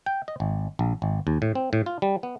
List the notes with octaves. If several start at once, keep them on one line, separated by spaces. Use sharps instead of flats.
G5
D#5
G#1
A#1
G#1
D#2
A2
C4
A2
F4
G3
B3